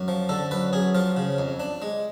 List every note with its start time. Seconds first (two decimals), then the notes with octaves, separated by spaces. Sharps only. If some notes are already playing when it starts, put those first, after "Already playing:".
Already playing: F#2
0.08 F3
0.29 D3 A4
0.51 F#2 B4
0.73 F#2 G#4
0.95 F3 F4
1.17 C#3
1.38 F2
1.60 D4
1.82 G#3